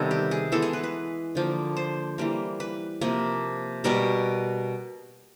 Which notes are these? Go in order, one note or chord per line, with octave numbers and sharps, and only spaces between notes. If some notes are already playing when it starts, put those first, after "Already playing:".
Already playing: C3 D#3 G3 B3 A4
G4
G#4
E3 G#3 B3 A4
G#4
B4
B4
D3 F3 A#3
C5
E3 G3 A#3
B4
C3 F3 A#3
B2 G3 B3 A#4